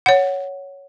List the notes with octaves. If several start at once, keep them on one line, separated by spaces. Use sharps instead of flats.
C#5 F#5